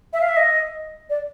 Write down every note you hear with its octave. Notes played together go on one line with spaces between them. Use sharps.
E5
F5
E5
D#5
D5